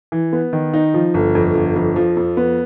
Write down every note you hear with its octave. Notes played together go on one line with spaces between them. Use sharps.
E3
B3
D#3
D#4
F3
G1
F2
G1
F2
F3
F2
B3